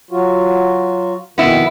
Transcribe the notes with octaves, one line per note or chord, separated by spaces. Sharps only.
F#3 F4 F#4
F2 B2 D#3 B3 E4